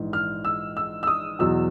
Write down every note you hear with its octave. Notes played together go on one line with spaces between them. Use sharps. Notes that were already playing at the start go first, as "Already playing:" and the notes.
Already playing: A#1 G#2 E3
F6
E6
E6
E6
D#6
E2 B2 F#3 E6